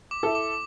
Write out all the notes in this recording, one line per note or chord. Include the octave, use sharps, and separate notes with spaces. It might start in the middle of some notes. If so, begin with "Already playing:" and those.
D6
E4 A4
D6